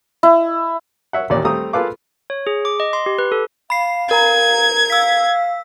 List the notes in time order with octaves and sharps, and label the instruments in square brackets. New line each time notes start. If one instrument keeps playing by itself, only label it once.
[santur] E4
[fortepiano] C#5 E5 F#5
A1 D#2 A#2 D5
G3 A3 C4 A#5 D#6
F4 G#4 A4 B4 F5 D6
[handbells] C#5
G#4
D6
D#5
C6
G4
B4
A4
[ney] F5 [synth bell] B5 C7
[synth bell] A#4 A#5 [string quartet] G#6
[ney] F5 [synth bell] E6 B6